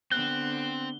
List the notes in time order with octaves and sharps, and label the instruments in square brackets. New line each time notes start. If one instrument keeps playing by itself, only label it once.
[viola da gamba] D3 B3 [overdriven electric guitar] C4 [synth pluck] F#6 [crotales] G7